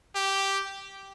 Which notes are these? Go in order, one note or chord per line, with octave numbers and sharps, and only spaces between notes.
G4